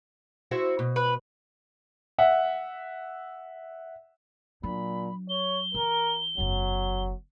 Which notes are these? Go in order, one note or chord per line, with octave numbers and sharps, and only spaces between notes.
E4 F#4 C5
B2
B4
E5 F#5
A#2 F#3 D4 B5
C#5 G7
E3 A#4
F#1 E2 F#3